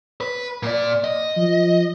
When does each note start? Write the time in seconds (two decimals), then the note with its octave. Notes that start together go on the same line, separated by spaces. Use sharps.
0.21 B4
0.63 A#2 D5
1.04 D#5
1.36 F3